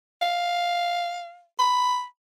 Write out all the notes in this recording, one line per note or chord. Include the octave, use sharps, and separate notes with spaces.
F5
B5